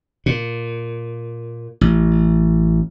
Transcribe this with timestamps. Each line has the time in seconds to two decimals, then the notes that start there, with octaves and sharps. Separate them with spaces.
0.26 A#2
1.81 A1